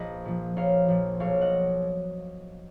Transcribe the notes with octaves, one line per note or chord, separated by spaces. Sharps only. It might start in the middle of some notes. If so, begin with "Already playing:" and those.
Already playing: A#1 B4 D#5
A#2 F3
A#1 C#5 F5
A#2 F3
B1 C#5 F5
D#5 F#5